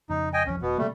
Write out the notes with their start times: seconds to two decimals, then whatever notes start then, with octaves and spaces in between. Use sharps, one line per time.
0.10 F2 C#3 D#4
0.33 D#5 G5 G#5
0.46 C2 F2 F3 C#4
0.62 F1 B2 B3
0.78 C3 G3 A3 A#3